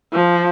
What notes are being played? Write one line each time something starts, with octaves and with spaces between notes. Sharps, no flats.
F3